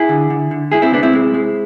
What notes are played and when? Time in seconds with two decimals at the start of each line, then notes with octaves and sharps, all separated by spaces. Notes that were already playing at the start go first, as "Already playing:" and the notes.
Already playing: E4 G#4
0.09 D3
0.30 D3
0.51 D3
0.72 G#3 E4 G#4
0.82 C4 E4
0.93 C3 B3 D4
1.03 C4 E4
1.13 G#3
1.34 G#3